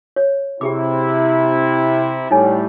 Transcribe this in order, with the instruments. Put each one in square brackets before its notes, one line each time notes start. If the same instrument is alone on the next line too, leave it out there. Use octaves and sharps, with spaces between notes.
[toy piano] C#5
[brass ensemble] C3 E4 [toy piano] G4 G#4 D6
[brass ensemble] A2 G3 [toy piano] D#4 C#5 G#5